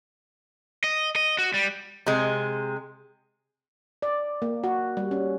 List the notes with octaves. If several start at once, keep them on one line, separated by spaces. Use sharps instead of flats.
D#5
D#5
F#4
G3
C3 G#3
D5
A#3
F#4
G3
C#4